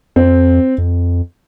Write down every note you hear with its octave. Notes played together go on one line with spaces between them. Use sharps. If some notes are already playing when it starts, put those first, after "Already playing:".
F2 C4
F2